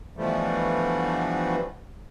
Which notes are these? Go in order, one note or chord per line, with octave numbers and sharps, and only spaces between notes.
B2 D3 E3 F3 G3 A3